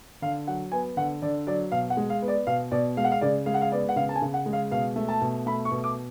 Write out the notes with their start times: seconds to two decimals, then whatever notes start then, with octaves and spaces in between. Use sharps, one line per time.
0.22 D3 F5
0.47 F#3 F#5
0.72 B3 G#5
0.97 D3 F#5
1.22 D3 D5
1.47 F#3 D5
1.72 B2 F5
1.90 F#5
1.97 G#3
2.10 F5
2.22 B3
2.28 D5
2.47 B2 F5
2.72 B2 D5
2.97 G#3 F5
3.04 F#5
3.12 F5
3.21 C#3 D5
3.46 G#3 F5
3.54 F#5
3.61 F5
3.72 B3 D5
3.89 F#5
3.96 C#3 F5
4.09 A5
4.16 G#5
4.22 C#3
4.34 F#5
4.46 G#3
4.53 F5
4.71 B2 F5
4.96 A3
5.08 A5
5.21 B2
5.46 A3 B5
5.65 C#6
5.71 B2
5.84 D6